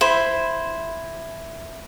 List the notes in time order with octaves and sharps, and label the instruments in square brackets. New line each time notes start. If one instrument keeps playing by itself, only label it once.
[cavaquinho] E4 C5 B5